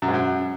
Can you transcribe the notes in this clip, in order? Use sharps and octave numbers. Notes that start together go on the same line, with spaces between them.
F#2
G#2
F#2